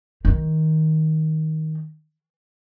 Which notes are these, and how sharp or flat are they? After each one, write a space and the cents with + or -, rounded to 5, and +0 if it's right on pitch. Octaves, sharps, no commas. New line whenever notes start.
D#3 +15